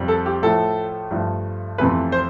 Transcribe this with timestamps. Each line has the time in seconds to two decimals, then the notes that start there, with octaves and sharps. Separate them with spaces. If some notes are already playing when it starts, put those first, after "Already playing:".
Already playing: F2 C3 G3
0.08 A4
0.26 G4
0.42 A2 F3 A3 A4
1.11 G2 F3 A3
1.78 F2 C3 E3 A3 B4
2.12 C5